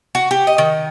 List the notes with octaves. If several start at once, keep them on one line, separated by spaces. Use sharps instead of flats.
F#4
G4
D#5
D#3